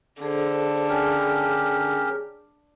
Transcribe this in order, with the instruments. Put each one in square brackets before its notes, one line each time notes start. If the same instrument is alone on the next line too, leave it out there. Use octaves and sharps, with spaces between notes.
[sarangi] D3 [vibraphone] G#4 A4 C5
[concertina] C#4 G4 A#4 [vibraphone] G#4